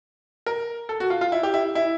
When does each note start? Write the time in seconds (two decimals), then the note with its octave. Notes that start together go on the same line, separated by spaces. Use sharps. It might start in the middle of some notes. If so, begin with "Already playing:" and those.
0.46 A#4
0.89 A4
1.00 F#4
1.10 F4
1.21 F4
1.32 E4
1.43 G4
1.54 E4
1.75 E4